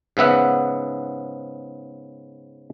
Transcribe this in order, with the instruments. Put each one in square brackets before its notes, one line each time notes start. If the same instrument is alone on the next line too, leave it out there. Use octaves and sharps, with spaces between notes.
[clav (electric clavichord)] G#2 C#3 B3 E5 F#5